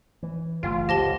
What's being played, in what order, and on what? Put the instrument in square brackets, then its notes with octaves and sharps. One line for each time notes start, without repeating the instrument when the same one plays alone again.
[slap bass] E3
[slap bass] F#1 E3 A3 [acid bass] F4
[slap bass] G1 C#2 [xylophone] G4 A5 G7 [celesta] C5 A#6